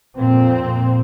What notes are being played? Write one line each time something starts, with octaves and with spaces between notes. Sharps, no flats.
F2 A#2 C4